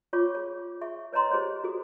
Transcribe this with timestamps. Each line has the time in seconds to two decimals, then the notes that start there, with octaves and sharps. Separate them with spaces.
0.13 F4 C#5 C#6 D6
0.35 G#4 C#5
0.81 G#4 E5 C#6
1.12 B4 C#5 D#5 A#5 C6
1.30 G4 G#4 C5 C#5 D#5
1.64 F#4 G#4 A4